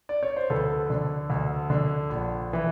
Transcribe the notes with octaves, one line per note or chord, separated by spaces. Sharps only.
D5
C#5
C5
D2 A4 B4
D3
D2
D3
A#1
E3